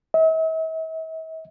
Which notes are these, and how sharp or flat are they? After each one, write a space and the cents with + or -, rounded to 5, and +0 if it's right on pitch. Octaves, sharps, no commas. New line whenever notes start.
E5 -45